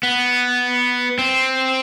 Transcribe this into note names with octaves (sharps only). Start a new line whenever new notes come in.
B3
C4